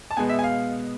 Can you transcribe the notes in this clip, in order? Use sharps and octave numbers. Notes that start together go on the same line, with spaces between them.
A5
B2 G#3 B3 G#5
E5
G#5
F5